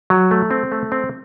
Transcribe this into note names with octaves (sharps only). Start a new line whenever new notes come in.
F#3
A3
C4
A3
C4